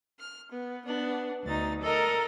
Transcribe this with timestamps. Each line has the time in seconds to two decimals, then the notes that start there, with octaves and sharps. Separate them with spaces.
0.19 F6
0.52 B3
0.84 B3 D4
1.44 D2 D#4 A6
1.81 A4 A#4 D#5